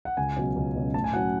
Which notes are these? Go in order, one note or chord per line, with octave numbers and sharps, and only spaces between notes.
F#5
C#2 G#5
B2 F#3 C#4
C#2
B2 F#3 C#4
A2 A5
G#5
F#3 C#4 F#5